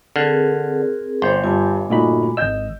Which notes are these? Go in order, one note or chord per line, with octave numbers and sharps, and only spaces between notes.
D3 C4 G#4 A#4 F6 F#6
G1 C5 C6 G6
G2 F4 G#5 D6
A#2 A3 D#4 F#4 D#5 B5
G#1 D#5 E6 G6